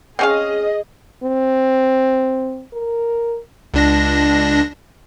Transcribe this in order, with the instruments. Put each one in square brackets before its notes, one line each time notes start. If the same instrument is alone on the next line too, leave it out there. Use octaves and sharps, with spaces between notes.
[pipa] C4 C#4 F5 [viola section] G#4 D#5
[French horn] C4
A#4
[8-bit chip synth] C#2 D4 A#6